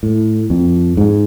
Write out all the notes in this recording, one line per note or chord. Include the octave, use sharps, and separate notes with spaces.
A2
F2
G#2